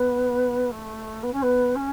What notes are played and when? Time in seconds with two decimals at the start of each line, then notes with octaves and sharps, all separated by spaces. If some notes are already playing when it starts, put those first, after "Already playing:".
Already playing: B3
0.71 A3
1.23 B3
1.33 C#4
1.42 B3
1.75 C#4